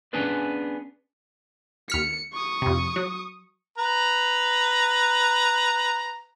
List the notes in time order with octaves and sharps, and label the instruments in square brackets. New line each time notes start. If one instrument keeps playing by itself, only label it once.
[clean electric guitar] B3 C#4 D4 G#4 B4 D5
[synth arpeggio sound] D#2 F6 B6 [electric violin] C#7
[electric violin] C#6 D#6
[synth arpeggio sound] F2 C3
F#3
[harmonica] B4 A#5